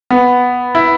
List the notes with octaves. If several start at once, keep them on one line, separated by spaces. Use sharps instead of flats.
B3
E4